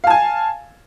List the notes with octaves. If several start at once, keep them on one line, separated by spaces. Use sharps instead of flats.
F5 G#5 A5